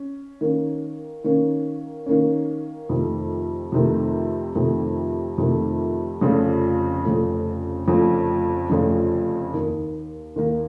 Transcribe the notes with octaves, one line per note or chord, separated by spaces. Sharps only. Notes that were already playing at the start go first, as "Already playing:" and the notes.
Already playing: C#4
D#3 A#3 C#4
D#3 A#3 C#4
D#3 A#3 C#4
F2 C3 D#3 A3
F2 C3 D#3 A3
F2 C3 D#3 A3
F2 C3 D#3 A3
F1 F2 C#3 F3 A3
F1 F2 C#3 F3 A3
F1 F2 C#3 F3 A3
F1 F2 C#3 F3 A3
D#2 D#3 A#3
D#2 D#3 A#3